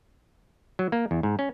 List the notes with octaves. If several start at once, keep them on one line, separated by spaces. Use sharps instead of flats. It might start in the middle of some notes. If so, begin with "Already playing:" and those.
F#3
A#3
E2
G#2
C#4